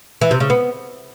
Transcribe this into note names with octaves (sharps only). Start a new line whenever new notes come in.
E3
C3
C#3
B3